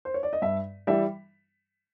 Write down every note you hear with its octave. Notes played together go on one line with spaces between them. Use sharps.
C5
C#5
D5
D#5
G2 E5
E3 G3 E5